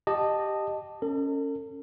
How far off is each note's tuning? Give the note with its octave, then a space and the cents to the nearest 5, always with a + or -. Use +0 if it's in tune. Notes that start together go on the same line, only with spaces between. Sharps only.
G4 +0 D#5 -15 A5 +0
C#4 +0 A4 +45